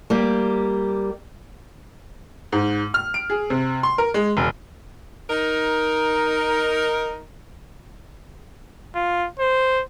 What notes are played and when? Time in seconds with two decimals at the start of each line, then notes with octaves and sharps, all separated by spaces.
0.10 G3 A#3 G4
2.52 G#2
2.94 F6
3.14 D7
3.30 G#4
3.50 C3
3.83 C6
3.98 A#4
4.14 G#3
4.37 E1
5.30 D#4 A#4
8.95 F4
9.39 C5